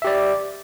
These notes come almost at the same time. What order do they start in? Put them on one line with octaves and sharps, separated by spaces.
E5 G4 D5